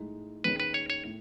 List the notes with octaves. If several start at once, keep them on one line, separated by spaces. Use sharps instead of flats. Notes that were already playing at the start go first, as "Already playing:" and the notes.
Already playing: A2 G#3 D#4
D#2 D#3 G#3 C#4 B4
B4
C#5
C#5
A2